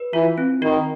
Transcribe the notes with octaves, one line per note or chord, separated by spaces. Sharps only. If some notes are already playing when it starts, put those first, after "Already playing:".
Already playing: B4
E3 F4
C4
D#3 F#4